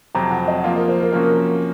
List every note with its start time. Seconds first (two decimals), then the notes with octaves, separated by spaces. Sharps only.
0.15 F2 C3 F#3 C4 A#5
0.31 F#5
0.48 D#5
0.64 F3 A#3 F4 F5
0.76 A#4
0.88 C5
1.01 A#4
1.13 C3 F3 A#3 C#4 F#4 A#4